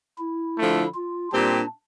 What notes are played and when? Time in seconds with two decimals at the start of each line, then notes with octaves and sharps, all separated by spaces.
0.18 E4
0.57 D3 F3 A3
0.94 F4
1.32 A#2 G3 C4 D4 G4